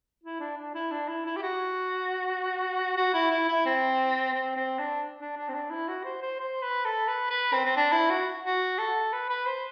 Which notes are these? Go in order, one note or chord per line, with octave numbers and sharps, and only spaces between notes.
E4
D4
D4
E4
D4
E4
E4
G4
F#4
F#4
E4
E4
E4
C4
C4
C4
D4
D4
D4
C4
D4
E4
F#4
C5
C5
C5
B4
A4
B4
B4
C4
C4
D4
E4
F#4
F#4
A4
B4
B4
C5